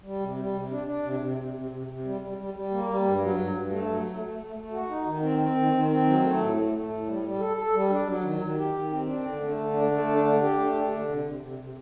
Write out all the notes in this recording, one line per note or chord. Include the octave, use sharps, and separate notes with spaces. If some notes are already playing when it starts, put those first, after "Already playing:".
G3
C3
G3
C3
D4
D4
C3
C3
C3
C3
C3
C3
G3
G3
G3
G3
A#3
G3
G2
F#3
G2
G2
A3
F#3
A3
A3
A3
A3
F#4
D#4
D#3
C4
C4
D#3
D#3
C4
F#3
A3
A2
A3
A3
A2
G3
G3
A4
A4
G3
D4
F#3
D#3
D#3
G4
D#3
C4
D4
D3
A3
D3
D4
A3
D3
D4
G4
A3
D4
D3
C3
C3
C3
C3